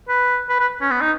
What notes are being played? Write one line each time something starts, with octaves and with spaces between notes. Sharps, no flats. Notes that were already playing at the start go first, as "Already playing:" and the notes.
B4
B4
B4
C#4
B3
D#4